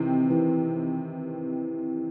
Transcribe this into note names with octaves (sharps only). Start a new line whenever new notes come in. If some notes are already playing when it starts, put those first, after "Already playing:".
Already playing: C3 D#3 E3 C4
E3